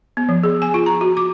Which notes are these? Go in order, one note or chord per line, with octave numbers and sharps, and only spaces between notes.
B3
F3
G#4
G#5
F4
A#5
F#4
D6